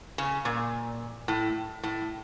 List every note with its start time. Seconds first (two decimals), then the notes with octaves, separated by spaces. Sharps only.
0.18 C#3
0.45 A#2
1.28 A2
1.83 A2